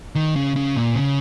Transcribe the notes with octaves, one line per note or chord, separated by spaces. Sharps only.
D#3
C#3
C#3
A#2
C#3